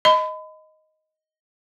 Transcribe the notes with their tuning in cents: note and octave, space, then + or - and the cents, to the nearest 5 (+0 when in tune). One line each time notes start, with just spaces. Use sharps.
D#5 +5 B5 +35